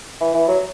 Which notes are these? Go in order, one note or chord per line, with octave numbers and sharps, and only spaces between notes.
E3
E3
F#3